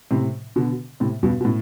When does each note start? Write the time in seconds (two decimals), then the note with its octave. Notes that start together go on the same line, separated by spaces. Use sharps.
0.11 A2 C3
0.56 B2 D3
1.00 A2 C3
1.23 G2 B2
1.40 B2
1.45 A2